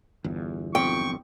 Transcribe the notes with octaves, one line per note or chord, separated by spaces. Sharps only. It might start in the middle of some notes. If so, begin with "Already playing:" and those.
G1 E2
B1 F2 G5 C#6